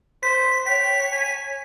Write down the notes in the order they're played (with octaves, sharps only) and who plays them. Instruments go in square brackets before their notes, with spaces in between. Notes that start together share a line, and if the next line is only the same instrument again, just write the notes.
[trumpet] C5 [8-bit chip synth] B6
[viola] C#5 [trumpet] G5 [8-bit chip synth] B6
[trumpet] G#5